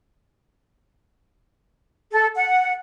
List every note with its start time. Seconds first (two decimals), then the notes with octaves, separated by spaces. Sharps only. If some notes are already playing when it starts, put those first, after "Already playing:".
2.12 A4
2.35 F#5